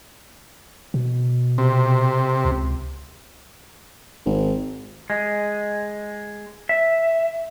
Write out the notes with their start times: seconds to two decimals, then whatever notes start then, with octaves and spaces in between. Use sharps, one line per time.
0.94 B2
1.58 C3
2.45 C#2
4.26 G#1
5.10 G#3
6.69 E5